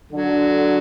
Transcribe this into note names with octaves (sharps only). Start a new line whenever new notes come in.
D3 F#3